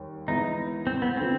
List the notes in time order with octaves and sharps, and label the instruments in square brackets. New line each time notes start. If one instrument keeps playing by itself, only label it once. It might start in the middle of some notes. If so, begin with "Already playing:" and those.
Already playing: [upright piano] D#2 D#3 G3
[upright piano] E3 G#3 B3 E4 [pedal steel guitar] D#4
[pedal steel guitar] C4
B3
[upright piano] D3 F3 [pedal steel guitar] C4